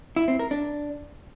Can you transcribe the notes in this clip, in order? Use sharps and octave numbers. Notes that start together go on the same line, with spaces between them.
E4
C4
A#4
D4